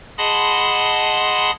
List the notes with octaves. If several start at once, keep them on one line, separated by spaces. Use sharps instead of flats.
G#4 D#5 F#5 A5 B5 C6